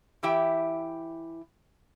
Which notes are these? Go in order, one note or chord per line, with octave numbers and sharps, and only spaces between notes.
E3 E4 G4 E5 G5